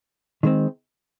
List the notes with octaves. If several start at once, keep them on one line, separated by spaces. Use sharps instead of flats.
D#3 G#3 C4